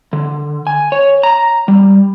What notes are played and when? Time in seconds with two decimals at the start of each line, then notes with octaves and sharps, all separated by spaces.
0.13 D3
0.67 G#5
0.92 C#5
1.23 A#5
1.68 G3